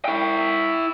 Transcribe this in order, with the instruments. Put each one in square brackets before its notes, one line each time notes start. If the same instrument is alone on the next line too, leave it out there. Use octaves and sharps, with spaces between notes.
[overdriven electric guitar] E4 G5